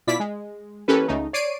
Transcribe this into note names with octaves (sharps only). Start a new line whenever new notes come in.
B2 E4 F4 D5 B6
G#3
E3 A#3 C#4 G4 A4 B4
C#2 C#3 A3 D#4
C#5 D5 C7 D7 D#7